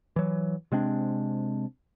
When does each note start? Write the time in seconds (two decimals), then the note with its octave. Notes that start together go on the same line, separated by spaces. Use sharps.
0.16 E3 F#3
0.72 C3 G#3 C4 D4